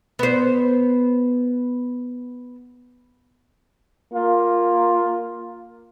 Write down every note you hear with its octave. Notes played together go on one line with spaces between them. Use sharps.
B3 C5
A#3 F4